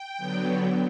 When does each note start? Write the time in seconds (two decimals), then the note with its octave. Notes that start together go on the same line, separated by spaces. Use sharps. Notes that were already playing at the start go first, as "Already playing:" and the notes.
Already playing: G5
0.18 D3 F#3 B3